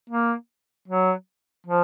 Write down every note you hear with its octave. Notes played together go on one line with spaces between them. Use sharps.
A#3
F#3
F3